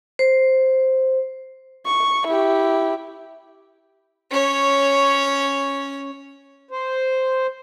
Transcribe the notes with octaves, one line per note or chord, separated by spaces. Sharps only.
C5
C#6
E4 G4
C#4 C#5
C5